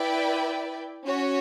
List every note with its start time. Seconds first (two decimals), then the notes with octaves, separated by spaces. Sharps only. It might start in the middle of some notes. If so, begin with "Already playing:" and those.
Already playing: E4 B4 D5 G5
1.04 C#4 F#4 C#5